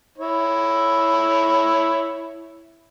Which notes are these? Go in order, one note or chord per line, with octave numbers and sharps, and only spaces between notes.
E4 C#5